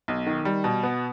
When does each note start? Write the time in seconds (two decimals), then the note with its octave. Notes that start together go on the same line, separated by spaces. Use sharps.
0.08 B1
0.27 D#3
0.45 G3
0.64 B2
0.83 B3